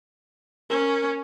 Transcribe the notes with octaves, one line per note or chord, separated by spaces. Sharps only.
C#4 A#4